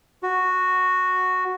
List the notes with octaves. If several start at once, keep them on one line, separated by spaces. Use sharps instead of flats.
F#4